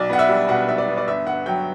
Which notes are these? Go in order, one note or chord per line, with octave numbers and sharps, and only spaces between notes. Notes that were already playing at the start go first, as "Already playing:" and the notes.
Already playing: B1 D5
B3 F#5
E5
G3
B2 F#5
B1 E5
D5
B3
D5
G1 E5
G1 F#5
F#3 G5